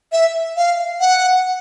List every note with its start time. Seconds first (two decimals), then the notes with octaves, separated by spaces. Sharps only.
0.12 E5
0.57 F5
1.00 F#5